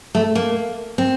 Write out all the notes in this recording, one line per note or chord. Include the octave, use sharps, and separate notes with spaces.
A3
A#3
C4